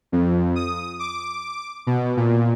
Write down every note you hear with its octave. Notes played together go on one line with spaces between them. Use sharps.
F2
D#6
D6
B2
A#2